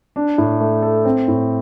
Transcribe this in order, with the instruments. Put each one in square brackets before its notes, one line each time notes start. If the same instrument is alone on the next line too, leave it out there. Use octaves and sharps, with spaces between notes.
[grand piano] D4
A2
A3
A4
C4
A2